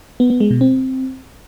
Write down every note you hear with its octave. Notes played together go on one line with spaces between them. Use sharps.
B3
B3
G#3
B2
C4